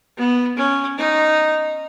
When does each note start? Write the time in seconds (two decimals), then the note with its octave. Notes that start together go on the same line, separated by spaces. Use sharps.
0.17 B3
0.57 C#4
0.97 D#4